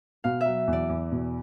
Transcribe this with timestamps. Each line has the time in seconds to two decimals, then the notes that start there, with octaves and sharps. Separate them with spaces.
0.24 B2 F5
0.41 E5
0.46 F#3
0.67 E2
0.73 D5
0.89 E2
1.12 B2